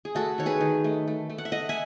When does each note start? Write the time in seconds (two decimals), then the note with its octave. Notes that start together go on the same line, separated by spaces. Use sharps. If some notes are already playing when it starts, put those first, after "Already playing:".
0.05 G#4
0.15 A3 F#4 A4
0.38 D#3 C#5
0.46 G#4 B4
0.61 D#3
0.84 A3
1.08 A3
1.30 A3
1.38 F#5
1.45 E5
1.52 A3 D#5 F#5
1.69 E5 G#5